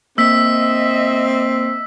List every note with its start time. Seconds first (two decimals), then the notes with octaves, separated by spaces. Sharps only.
0.18 A#3 C4 D#5 E5 E6 B6